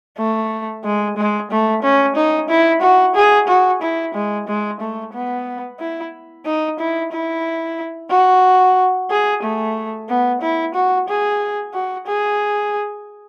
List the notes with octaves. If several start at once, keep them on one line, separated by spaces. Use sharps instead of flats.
A3
G#3
G#3
A3
C#4
D#4
E4
F#4
G#4
F#4
E4
G#3
G#3
A3
B3
E4
D#4
E4
E4
F#4
G#4
A3
B3
E4
F#4
G#4
F#4
G#4